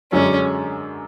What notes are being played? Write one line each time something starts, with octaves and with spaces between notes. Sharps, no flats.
F#2 D3 G#3 C#4 D4